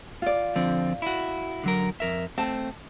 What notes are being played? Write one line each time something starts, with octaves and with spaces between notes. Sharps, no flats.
F4 D5
D3 F3 C4
E4 F#4
D3 F#3 A#4
F2 A#4 E5
A3 C4 A5